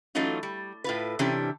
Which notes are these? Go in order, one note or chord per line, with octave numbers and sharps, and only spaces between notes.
E3 F#3 A3 C#4 D#4 F4
G3
A2 F4 B4
C3 E3 C#4 D4 G4